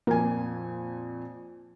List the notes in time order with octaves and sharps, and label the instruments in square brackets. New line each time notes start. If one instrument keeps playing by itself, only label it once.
[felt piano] F2 A#2 G#5 [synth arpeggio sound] A#3